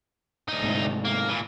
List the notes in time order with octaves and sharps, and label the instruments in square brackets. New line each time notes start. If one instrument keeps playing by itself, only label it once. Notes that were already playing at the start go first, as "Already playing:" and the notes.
[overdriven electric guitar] D2 D#4
[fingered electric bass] G#2 C3 A3
[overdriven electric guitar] A#3
A#2 E3